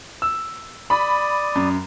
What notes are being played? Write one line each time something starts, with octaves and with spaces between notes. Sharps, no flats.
E6
D5 B5 D#6
F#2